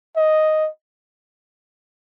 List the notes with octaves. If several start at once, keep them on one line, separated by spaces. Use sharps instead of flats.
D#5